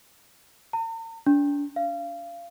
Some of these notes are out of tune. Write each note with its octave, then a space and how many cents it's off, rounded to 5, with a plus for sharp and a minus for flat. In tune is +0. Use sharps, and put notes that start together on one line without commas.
A#5 -45
D4 -35
F5 -25